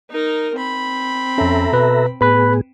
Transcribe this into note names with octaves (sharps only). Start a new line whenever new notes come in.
D#4 A#4
C4 B5
F2 C#4 A4 E5 A#5
B2 B4
A2 B3 G#4 B4 B5 F#6